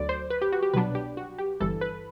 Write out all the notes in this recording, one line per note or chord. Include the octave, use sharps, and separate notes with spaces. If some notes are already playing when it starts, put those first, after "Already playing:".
Already playing: D2 D3 F#3 D5
C5
B4
G4
F#4
G4
C2 B2 F#3 B3 D4 B4
G4
F#4
G4
G1 G2 E3 A4
B4